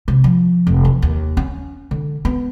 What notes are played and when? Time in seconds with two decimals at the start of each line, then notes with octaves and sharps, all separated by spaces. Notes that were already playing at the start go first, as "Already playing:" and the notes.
0.08 C3
0.24 F3
0.67 F1
0.85 E2
1.02 D#2
1.37 C#4
1.91 D3
2.25 B3